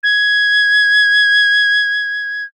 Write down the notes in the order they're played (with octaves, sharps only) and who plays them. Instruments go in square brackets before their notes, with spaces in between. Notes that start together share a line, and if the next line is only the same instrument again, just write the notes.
[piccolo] G#6